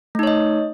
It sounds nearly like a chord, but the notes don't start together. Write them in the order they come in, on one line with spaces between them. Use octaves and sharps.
A3 D#4 C#5 D#5